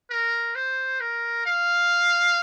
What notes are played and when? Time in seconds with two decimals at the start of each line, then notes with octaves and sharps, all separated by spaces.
0.11 A#4
0.55 C5
1.00 A#4
1.46 F5